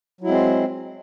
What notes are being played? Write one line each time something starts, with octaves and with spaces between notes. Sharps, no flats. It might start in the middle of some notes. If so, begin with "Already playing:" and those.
F#3 G#3 C4 E4